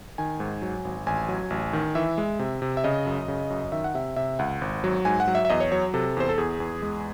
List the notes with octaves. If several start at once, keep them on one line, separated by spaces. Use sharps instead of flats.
D#3 G#5
G#2
F#3
G#1
A1 G#5
F#3
A1
D#3
E3 E5
G#3
C3
C3
E5
C#3 D#5
F#2
C#3
F#2
D#3 E5
F#5
C3 E5
C3 E5
C#2 F#5
G#1
F#3
G#2 G#5
F#5
F#3
E5
E5
E2 D#5
C#5
F#3 C#5
C3 A4
E2 C5
A4
E2 G#4
E2
G#3